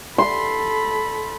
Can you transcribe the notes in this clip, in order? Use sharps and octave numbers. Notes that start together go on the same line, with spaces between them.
A4 B5 C6